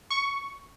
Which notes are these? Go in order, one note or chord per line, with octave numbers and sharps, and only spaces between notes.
C#6